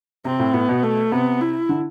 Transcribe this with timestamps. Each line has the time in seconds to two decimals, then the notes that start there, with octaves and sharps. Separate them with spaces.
0.25 C3 C4
0.39 A2
0.54 A2 B3
0.69 B2
0.83 A3
1.11 C3 B3
1.41 E4
1.69 D3